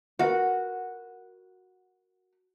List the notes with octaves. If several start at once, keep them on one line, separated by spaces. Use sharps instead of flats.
F#4 A#4 B4 F#5